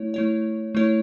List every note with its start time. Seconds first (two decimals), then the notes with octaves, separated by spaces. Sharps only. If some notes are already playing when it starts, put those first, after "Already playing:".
Already playing: A3 E4 C#5
0.14 A3 E4 C#5
0.75 A3 E4 C#5